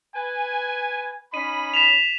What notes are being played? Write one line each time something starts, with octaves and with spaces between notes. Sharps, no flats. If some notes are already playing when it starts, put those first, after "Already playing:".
B4 G#5
C#4 D#4 B5 D#7
B6 E7 F7